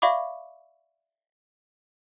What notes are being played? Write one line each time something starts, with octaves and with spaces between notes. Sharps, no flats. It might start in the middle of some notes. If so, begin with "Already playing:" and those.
D5 E5 F5 B5 C#6 D6